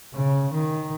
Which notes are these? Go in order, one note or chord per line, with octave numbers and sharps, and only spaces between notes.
C#3
D#3